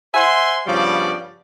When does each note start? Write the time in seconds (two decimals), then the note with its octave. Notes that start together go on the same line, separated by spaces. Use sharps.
0.14 C5 E5 F#5 G#5 C6
0.66 G2 C#3 F3 G3 B3 D5